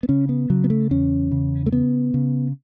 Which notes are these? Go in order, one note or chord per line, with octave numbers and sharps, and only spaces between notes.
B3
C#3 C#4
B3
C#3 F#3
B3
A3
E2 C#4
C#3
A3
C#3 B3
C#3